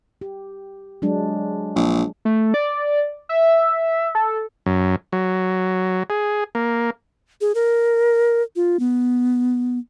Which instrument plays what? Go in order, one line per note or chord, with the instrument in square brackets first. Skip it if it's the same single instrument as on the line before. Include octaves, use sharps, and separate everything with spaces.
[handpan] G4
F#3 G#3 D4
[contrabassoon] A#1
[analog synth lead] A3
D5
E5
A4
[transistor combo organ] F#2
F#3
G#4
A#3
[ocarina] G#4
A#4
F4
B3